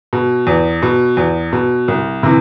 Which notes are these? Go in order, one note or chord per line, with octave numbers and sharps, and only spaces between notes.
B2
E2
B2
E2
B2
C2
C3 E3